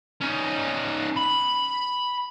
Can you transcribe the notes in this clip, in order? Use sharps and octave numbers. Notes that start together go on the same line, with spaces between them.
C#4 D#4
B5